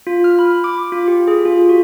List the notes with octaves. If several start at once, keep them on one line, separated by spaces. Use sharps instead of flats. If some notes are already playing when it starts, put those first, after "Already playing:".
F4
F6
B5
D6
F4
G4
G#4
F4
F#4